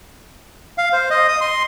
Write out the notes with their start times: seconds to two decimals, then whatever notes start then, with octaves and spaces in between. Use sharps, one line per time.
0.78 F5
0.93 C5
1.10 D#5
1.28 D#6
1.41 C6